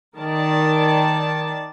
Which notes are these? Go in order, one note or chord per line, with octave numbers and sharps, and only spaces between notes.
D#3 A#4 D5 A5